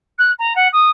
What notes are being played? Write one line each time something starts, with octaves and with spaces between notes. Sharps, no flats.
F#6
A#5
F#5
D#6